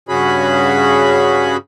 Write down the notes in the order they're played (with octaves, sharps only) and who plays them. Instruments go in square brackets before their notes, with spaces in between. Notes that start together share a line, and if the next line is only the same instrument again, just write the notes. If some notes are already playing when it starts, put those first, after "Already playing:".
[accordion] G2 C#3 C#4 F#4 G#4 B5